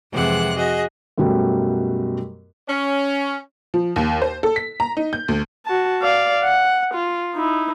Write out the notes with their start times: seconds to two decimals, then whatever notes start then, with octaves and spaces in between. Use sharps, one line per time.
0.12 F2 C3 E3 G#3 F#5 F#6
0.56 F#4 G#4 D#5
1.17 F#2 B2 F#3 G3 A3 F#4
2.68 C#4
3.74 F3
3.96 D#2
4.22 C5
4.43 A4
4.56 B6
4.80 A#5
4.97 D#4
5.13 G6
5.28 D2
5.66 F#4 A5
6.02 D5 F5
6.44 F#5
6.94 F4
7.36 D#4 E4